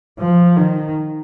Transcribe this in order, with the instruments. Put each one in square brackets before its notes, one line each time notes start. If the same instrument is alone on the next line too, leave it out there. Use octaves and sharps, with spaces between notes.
[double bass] F3
D#3